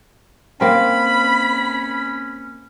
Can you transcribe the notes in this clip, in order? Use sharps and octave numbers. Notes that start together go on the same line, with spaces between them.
A#3 C4 C#4 B5